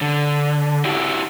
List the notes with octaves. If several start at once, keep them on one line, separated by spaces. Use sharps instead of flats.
D3
E4 F#4 G4